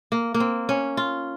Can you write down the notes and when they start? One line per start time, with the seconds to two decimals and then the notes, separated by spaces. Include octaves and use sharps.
0.12 A#3
0.34 A#3
0.40 C4
0.69 C#4
0.97 F4